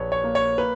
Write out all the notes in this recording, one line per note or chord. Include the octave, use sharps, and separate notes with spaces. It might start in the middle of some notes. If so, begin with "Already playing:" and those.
Already playing: A#1 A#2 B4 C#5
C#5
A#3
C#5
A#3 B4